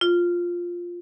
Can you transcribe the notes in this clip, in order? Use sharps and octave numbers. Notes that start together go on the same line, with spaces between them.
F4